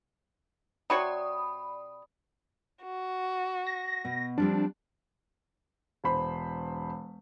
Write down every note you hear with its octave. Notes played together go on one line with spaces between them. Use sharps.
C3 F#4 C#5 D5 B5 D#6
F#4
A#6
B2
F3 G3 C4 D4
E1 C5 B5